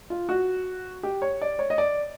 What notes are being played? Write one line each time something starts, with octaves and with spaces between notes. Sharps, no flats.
F4
F#4
G4
C#5
D5
C#5
D#5
D5